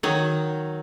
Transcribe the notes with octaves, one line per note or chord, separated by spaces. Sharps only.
D#3 F#3